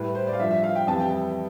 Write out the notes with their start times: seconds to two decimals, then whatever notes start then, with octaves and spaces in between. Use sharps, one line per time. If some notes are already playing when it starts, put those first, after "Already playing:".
Already playing: A2 G3 B4
0.15 C5
0.27 D5
0.33 F5
0.39 G2 F3 E5
0.51 E5
0.64 F5
0.76 G5
0.87 F2 E3 G3 A5
1.00 G5
1.12 G5